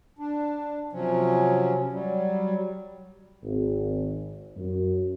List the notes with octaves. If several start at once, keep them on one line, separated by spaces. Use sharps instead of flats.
D4
C3 F3 F#3 C#4
F#3 G3
G#1
F#2